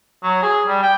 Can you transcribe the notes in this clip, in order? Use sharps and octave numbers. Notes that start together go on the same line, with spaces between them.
F#3
G#4
G3
G5